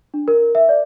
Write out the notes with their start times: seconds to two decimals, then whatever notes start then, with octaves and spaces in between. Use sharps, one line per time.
0.14 D4
0.28 A#4
0.55 E5
0.69 D5